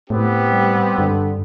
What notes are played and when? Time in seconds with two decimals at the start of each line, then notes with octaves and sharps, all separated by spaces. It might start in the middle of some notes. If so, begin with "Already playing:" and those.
0.10 A2 B3 C4 G4
0.51 G3
0.98 G2 D3